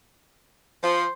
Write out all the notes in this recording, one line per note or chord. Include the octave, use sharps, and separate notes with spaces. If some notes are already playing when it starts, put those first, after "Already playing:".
F3 C5